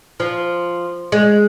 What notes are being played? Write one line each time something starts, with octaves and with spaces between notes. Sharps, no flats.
F3
G#3